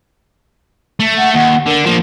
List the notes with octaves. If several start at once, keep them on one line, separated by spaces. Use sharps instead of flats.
A3
F#5
D#2 F#5
D3 D4 A#4
F3 A#3